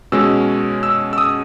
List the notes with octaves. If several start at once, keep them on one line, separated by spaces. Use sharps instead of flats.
B2 G#3 C#4 E6
E6
E6
D#6